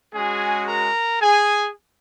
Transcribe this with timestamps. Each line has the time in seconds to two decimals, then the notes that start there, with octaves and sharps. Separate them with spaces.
0.14 G#3 C#4 F#4 G#4 G#5
0.68 A#4 A#5
1.22 G#4 G#5